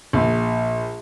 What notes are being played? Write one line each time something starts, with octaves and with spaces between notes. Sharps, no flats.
A#1